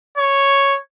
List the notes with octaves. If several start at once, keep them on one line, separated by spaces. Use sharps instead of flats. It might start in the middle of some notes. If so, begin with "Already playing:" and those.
C#5